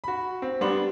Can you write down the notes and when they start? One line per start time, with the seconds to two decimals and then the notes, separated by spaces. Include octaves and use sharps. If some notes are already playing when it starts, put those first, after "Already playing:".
0.04 F#4 B5
0.42 C4
0.61 G3 B3 D4 C6 F#7